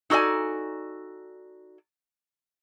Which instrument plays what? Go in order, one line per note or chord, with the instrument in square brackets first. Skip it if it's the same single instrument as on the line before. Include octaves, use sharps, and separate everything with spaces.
[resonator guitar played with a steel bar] D#4 F#4 A4 D5 G#5